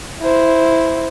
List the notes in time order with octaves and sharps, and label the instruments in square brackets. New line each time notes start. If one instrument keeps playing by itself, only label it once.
[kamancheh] E4 C5